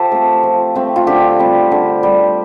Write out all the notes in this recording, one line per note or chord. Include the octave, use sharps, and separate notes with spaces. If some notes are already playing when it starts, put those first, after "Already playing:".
Already playing: F3 G4 A4 C5
A3 C4
F3
A3 C4
F4
D3 G4
G3 C4
D3
G3 C4